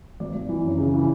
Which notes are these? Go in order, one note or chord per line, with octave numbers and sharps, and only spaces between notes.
G#1 D5
G#1
E3
F#2
C#3
E3